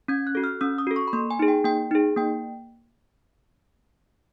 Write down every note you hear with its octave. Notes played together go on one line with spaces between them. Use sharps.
C#4 G#6
F#6
F#4 A4
F6
C#4 E6
D#6
F#4 A4
C#6
B5
A#3 C6
G#5
D#4 G#4
G5
A#3 G5
D#4 G#4
A#3 G5